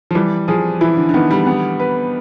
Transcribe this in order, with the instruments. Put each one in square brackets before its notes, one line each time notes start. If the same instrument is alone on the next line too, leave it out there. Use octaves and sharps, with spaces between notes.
[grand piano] F3
[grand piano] E3 [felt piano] G3
[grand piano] F3 [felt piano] G#4
[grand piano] E3 [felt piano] E4
[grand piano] D3
D3
[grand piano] D#3 [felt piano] B3
[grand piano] G3
[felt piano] B3
B4